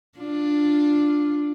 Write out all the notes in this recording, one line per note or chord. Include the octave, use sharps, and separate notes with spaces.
D4 F4